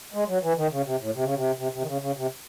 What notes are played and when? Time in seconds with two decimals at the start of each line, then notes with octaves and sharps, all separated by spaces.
0.14 G#3
0.28 F#3
0.43 E3
0.57 D#3
0.72 C#3
0.86 C3
1.01 A2
1.15 C3
1.25 C#3
1.35 C3
1.58 C3
1.73 C3
1.82 D#3
1.88 C#3
2.02 C#3
2.17 C3